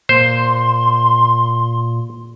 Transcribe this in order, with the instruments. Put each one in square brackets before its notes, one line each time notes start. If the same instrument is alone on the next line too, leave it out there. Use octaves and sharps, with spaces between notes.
[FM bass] A#2 [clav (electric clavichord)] C5 [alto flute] C6